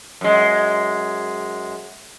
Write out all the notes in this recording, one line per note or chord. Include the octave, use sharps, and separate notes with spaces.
F#2 G#3